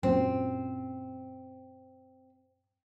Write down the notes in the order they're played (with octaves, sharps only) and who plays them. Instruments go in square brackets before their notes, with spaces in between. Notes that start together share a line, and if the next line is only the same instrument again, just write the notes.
[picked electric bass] F#2 A#2 [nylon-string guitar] C4